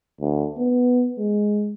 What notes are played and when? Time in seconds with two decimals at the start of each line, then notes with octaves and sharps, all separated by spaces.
0.21 D2
0.58 B3
1.18 G#3